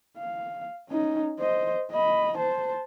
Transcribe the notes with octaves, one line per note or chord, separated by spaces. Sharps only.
F5
C#4 D#4
C5 D#5
D#5 B5
C5 A5